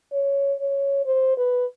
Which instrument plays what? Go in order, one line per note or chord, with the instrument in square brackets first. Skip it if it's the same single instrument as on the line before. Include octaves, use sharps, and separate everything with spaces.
[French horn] C#5
C#5
C5
B4